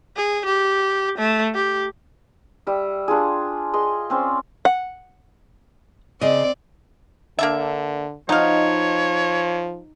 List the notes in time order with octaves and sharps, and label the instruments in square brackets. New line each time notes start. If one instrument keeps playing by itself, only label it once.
[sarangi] G#4
G4
A3
G4
[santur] G3 E5
D4 F4 G#4
G#4 D#5 C6
C4 C#4 C5 D5
[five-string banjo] F#5
[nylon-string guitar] C#3 D#5 [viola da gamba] C4 D5
[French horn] D3 [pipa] A#3 D4 E5
[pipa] B2 F5 [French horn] F3 [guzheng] D#4 [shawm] C#5